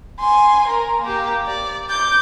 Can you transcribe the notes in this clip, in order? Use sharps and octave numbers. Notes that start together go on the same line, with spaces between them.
G#5 C6
A#4
A#3 G4
D5
D6 G6